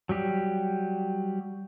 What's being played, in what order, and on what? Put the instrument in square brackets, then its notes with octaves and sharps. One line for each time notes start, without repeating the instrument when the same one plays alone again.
[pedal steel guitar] F#3 G3 G4